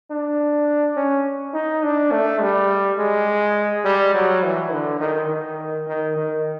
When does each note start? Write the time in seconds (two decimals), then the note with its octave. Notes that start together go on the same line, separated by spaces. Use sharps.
0.11 D4
0.97 C#4
1.54 D#4
1.83 D4
2.12 A3
2.41 G3
2.98 G#3
3.85 G3
4.14 F#3
4.43 E3
4.72 D3
5.00 D#3
5.29 D#3
5.87 D#3
6.16 D#3